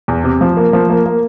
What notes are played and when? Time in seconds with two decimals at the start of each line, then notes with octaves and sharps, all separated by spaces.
0.08 E2
0.24 C3
0.41 F3
0.57 A#3
0.73 F3
0.90 A#3
1.06 A#3